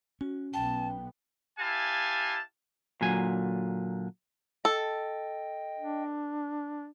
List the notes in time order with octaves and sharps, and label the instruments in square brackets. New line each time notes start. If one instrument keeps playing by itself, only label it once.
[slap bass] C#4 [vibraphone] F#4
[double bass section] B1 B3 [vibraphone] G5 [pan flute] A5
[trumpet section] E4 G4 F5 G#5 A5
[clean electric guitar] A#2 D3 F#3 G#5
[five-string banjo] A4 [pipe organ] D#5 G5
[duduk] D4